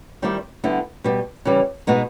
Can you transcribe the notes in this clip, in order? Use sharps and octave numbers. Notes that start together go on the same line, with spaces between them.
D#3 G3 C4 E4 G4
D3 G3 B3 E4
B2 G3 B3
C#3 E3 G3
B2 G#3 B3 D#4